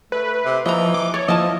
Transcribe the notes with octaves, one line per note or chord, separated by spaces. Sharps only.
A3 B4
C3
E3 F3 D#5 A#5
D6
C#5 D5
F3 E4 F4 D#5 A5